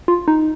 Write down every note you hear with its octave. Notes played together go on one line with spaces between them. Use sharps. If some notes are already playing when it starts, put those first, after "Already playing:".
F4
D#4